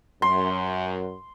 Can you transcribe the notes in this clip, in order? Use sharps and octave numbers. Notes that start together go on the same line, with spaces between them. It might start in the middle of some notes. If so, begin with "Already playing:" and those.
F#2 C6